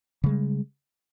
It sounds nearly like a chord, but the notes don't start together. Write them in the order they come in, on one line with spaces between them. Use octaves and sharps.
C#3 G#3 G3